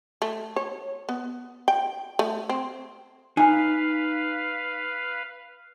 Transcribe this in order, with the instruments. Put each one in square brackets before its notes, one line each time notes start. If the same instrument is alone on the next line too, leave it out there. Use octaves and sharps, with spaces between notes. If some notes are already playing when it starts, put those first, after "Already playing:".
[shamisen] A3
C#5
B3
G5
A3
C4
[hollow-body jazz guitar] D#4 G#5 [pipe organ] B4 F5